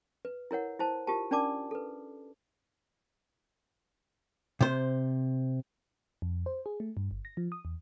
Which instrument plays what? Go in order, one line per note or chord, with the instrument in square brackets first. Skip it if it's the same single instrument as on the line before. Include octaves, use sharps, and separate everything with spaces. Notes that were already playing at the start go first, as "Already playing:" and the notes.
[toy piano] B4
E4 A#4 C#5 F#5
E4 C5 A5
F4 G4 A#4 A5
C#4 D4 A#4 D5 A5 D6
A4 B4
[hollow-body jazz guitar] C3 C5
[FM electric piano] F2
C5
G#4
A3
G2
G1
A#6
F3
D#6
E2